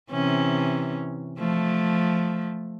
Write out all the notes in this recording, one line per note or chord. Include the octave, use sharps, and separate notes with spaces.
C3 E3 C#4
F3 A3